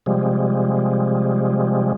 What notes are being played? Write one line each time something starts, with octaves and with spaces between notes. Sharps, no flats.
C3 F3 G3 G#3